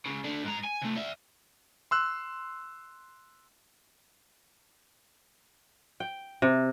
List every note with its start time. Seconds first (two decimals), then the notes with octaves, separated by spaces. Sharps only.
0.06 C#2 C#3
0.24 A3 D4
0.43 G#2 A#5
0.64 G#5
0.82 C3 A3
0.96 D5 E5
1.91 C6 E6 F#6
6.00 G5
6.42 C3